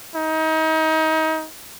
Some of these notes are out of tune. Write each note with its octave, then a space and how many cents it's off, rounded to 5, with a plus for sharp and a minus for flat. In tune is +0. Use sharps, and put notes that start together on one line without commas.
D#4 +30